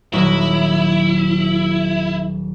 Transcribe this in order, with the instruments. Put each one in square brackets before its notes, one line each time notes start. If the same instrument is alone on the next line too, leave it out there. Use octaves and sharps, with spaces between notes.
[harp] D#1 F#3 D#4 [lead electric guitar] E4